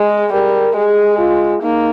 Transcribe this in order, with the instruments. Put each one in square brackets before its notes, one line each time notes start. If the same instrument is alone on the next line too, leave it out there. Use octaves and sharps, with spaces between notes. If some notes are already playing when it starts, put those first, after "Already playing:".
Already playing: [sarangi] G#3 [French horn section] G#4
[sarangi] G3 [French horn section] A#4
[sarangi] G#3 [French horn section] G#4
[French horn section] F4
[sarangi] A#3 [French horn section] D#4